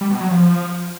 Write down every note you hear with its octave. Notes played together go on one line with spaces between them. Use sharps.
G3
B2
F#3
F3